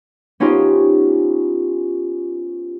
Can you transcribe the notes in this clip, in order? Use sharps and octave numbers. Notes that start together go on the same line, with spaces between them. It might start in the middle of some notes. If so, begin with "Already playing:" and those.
B3 C#4 D#4 F4 G4 C5